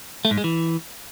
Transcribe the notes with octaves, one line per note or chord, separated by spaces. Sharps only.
A3
G#2
G#3
E3